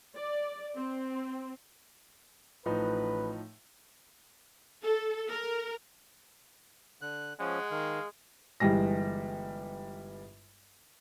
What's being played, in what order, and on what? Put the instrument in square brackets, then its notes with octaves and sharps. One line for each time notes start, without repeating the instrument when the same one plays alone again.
[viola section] D5
C4
[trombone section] A1 B4 [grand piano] A2 F3 D#4
[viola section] A4
A#4
[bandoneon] D3 F#6
[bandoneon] F3 C#4 [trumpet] G#3 [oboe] F#5
[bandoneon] D#3 [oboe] F5
[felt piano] G1 E3 G3 G#3 A#6